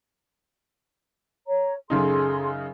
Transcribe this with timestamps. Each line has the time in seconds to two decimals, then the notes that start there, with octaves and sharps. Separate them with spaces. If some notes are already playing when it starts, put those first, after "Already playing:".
1.47 C#5 A#5
1.90 F#2 C#3 D#4 G#4 A4 C6